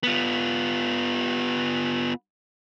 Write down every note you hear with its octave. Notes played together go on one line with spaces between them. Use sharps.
B3 F4